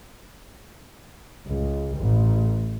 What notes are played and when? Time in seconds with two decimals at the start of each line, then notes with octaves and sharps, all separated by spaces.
1.46 C#2
1.96 A1